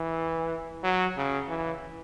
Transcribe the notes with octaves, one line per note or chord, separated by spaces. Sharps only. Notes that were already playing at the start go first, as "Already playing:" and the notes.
Already playing: E3
F#3
C#3
E3